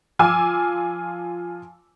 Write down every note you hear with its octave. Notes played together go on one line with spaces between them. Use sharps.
F3 F4 G#5 D6 E6